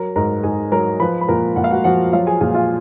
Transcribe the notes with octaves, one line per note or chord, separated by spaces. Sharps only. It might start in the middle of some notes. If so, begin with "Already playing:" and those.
Already playing: F#3 A#4 A#5
G#2 A#4 A#5
G#2 G#4 G#5
F#3 A#4 A#5
F3 B4 B5
B5
A#2 A#4 A#5
A#2 F#5
F5
F#4 F#5
F3 F#4 F#5
F#3 F4 F5
G#4 G#5
A#2 G#4 G#5
F4 F5